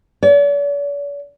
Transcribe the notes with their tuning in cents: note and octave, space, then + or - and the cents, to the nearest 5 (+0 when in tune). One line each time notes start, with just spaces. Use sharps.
D5 -45